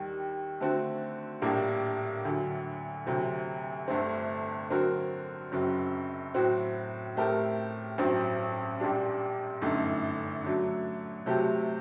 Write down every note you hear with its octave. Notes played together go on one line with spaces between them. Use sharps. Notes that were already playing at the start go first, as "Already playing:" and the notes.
Already playing: D#2 D#3 G3
D3 A3 C4 F#4
A#1 A2 G3 A#3 D4
D2 D3 F#3
D2 C3 F#3 C4
G1 G2 D3 A3 C4
D3 F#3 C4 F#4 A#4
F#1 F#2 F#3 C4
A2 F#3 C4 F#4
A2 A3 C4 G4 A#4
A1 G2 F#3 C4
A#1 A#2 G3 D4
G1 F#2 D3 A3 D#4
D3 F#3 A3
C3 F#3 A3 C4 G4